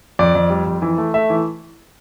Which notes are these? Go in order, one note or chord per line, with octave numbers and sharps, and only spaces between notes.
F2 D5
F2
G3
F2
E3
A3
A3 E5
E3